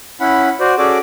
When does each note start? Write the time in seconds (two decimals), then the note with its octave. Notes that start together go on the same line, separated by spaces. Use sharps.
0.20 C#4 E4 F#5 B5
0.60 F#4 C5 D5
0.78 C#4 F#4 G#4 A4 D5 D6